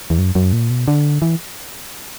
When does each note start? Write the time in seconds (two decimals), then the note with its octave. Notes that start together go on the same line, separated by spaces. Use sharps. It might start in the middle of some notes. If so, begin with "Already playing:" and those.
0.10 E2
0.18 F#2
0.35 F#2
0.53 A#2
0.70 B2
0.88 D3
1.22 E3